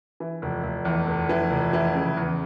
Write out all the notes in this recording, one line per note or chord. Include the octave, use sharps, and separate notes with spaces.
E3
F1
F1
E2
F1
E3
F1
E3
C#3
E2